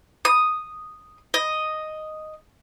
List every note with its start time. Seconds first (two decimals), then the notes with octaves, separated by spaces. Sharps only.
0.25 D#6
1.34 D#5